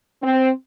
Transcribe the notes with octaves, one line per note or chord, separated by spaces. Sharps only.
C4